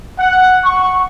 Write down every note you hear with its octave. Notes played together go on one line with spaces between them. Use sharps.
F#5
C#6